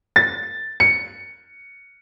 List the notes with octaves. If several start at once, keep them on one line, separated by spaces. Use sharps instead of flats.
A6
C#7